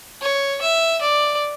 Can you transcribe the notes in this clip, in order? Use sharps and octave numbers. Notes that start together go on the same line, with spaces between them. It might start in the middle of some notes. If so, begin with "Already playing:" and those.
C#5
E5
D5